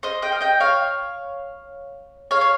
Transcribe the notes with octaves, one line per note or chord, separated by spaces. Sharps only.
C5 D#5
D#5 G5
F5
D#5 G5
C#5 F5
C#5 F5
C#5